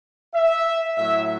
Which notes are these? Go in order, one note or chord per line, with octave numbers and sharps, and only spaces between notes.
E5
A2 F#3 E5